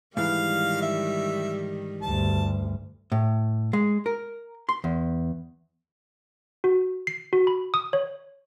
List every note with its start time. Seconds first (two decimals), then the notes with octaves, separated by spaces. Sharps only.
0.17 G#2 D#3 E3 G3 F5
0.82 E5
2.02 D2 G2 A5
3.12 A2
3.73 G#3
4.06 A#4
4.69 C6
4.84 E2
6.64 F#4
7.07 C7
7.33 F#4
7.47 B5
7.74 D#6
7.93 C#5